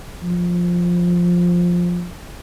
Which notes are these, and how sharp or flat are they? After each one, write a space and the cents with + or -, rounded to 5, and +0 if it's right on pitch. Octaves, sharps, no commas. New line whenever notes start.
F3 +5